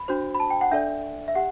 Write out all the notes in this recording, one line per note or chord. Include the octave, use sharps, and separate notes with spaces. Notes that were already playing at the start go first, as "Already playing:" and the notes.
Already playing: B5
D4 F#4 C5
B5
A5
G5
F#5
D4 A4 D5 E5
E5
G4 F#5